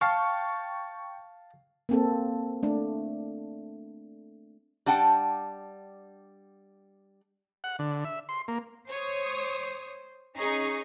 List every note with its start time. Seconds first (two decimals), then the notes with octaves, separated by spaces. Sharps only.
0.01 F5 G5 A5 C#6
1.89 A#3 C4 A4
2.63 A3 D4
4.86 G3 D4 F#5 G5 A5
7.64 F#5
7.79 D3
8.05 E5
8.29 C6
8.48 A#3
8.89 C5 C#5 D#6
10.38 C#4 D#4 G#4 C#6